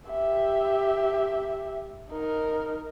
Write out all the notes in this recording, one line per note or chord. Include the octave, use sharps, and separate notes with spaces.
G4 E5
D#4 A#4